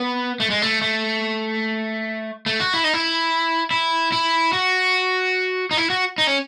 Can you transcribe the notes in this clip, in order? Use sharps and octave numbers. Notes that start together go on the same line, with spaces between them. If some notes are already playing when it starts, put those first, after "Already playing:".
Already playing: B3
A3
G#3
A3
A3
A3
F#4
E4
D#4
E4
E4
E4
F#4
D#4
E4
F#4
D#4
C#4